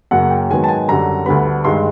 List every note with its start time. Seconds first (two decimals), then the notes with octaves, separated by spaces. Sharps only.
0.11 F#2 C#3 F#3 A#3 F#5
0.30 G5
0.50 G#2 D#3 F#3 B3 G#5
0.64 A5
0.68 G#5
0.88 F#2 D3 G3 A#5
1.26 D2 D3 G3 B3 B5
1.64 G2 D#3 G#3 C6